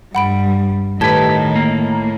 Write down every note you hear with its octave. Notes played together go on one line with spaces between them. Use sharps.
G2 G3 F#5 B5 D7
A2 D#3 G4 B4 A5 G#6
A#3